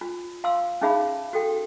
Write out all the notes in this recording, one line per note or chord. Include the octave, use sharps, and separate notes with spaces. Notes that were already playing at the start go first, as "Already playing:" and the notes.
F4
F5 C6 E6
C#4 D#4 G#4 E5 F5 B5
F#4 A4 G5